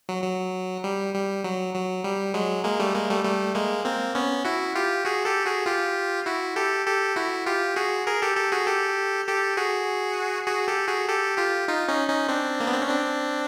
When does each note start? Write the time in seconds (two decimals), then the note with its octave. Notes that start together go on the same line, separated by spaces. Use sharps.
0.09 F#3
0.23 F#3
0.84 G3
1.14 G3
1.44 F#3
1.74 F#3
2.04 G3
2.34 F#3 G#3
2.64 G#3 A#3
2.79 G3 A3
2.94 G#3 A#3
3.09 G3 A3
3.24 G3 A3
3.55 G#3 A#3
3.85 A#3 C4
4.15 B3 C#4
4.45 E4 F#4
4.75 F4 G4
5.05 F#4 G#4
5.25 G4 A4
5.45 F#4 G#4
5.66 F4 G4
6.26 E4 F#4
6.56 G4 A4
6.86 G4 A4
7.16 E4 F#4
7.46 F4 G4
7.76 F#4 G#4
8.06 G#4 A#4
8.22 G4 A4
8.37 G4 A4
8.52 F#4 G#4
8.67 G4 A4
9.27 G4 A4
9.57 F#4 G#4
10.47 F#4 G#4
10.68 G4 A4
10.87 F#4 G#4
11.08 G4 A4
11.38 F4 G4
11.68 D#4 F4
11.88 C#4 D#4
12.08 C#4 D#4
12.28 C4 D4
12.60 A#3
12.67 B3
12.74 C4
12.82 C#4
12.89 C4 D4